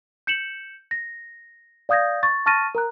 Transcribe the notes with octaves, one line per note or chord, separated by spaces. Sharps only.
G6 C#7 E7 F#7
A#6
D5 F5 D#6 G6 G#6 A#6
C#6 A6
A5 C#6 F6 A6 A#6 D#7
A#4 A#5 F#6